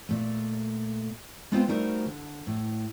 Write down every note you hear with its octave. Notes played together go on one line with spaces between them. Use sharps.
A#2 A3
G#3 B3 C4 F4 C5 G5
G3 A3 D#4 F#4 A#4 C5
D3
A2